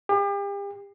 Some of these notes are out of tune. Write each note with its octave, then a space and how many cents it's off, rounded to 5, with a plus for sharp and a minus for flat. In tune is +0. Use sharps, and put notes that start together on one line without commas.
G4 +40